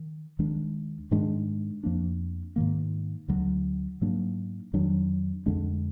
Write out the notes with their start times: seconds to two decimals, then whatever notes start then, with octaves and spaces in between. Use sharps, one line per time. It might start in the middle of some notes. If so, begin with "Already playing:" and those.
Already playing: D#3
0.39 D#2 D#3 G#3 D4
1.11 G#2 D#3 G#3 D4
1.83 F2 F3 A#3 D4
2.56 G#2 D#3 A#3
3.28 D2 D3 F#3
4.01 G#2 F#3 A#3 D4
4.73 F2 D#3 F#3 D4
5.46 F2 D3 G#3 D4